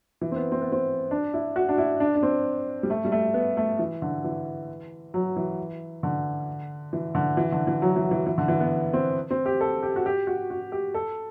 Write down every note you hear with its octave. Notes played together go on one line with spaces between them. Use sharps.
E3
C4
B3
C4
B3
C4
D4
E4
F#4
D4
E4
D4
D4
C4
G3
A3
G3
A3
B3
A3
E3
D3
E3
F#3
E3
D3
E3
D3
E3
D3
E3
F#3
E3
E3
E3
D3
E3
B3
C4
C4
G4
A4
G4
F#4
G4
F#4
F#4
G4
A4